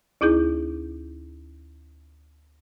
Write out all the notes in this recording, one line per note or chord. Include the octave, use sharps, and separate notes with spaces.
D2 D#4 E4 G#4 G6